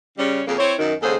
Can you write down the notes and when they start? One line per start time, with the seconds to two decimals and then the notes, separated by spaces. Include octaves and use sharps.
0.18 C#3 G3 C#4
0.48 F2 C#3 A#3
0.59 C4 E4 C5 C#5
0.78 F#2 D#3
1.02 D#2 G#2 C#3 G#4 A4 C5